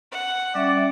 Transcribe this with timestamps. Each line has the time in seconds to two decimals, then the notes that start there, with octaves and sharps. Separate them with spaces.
0.12 F#5
0.55 G3 C#4 D5 E5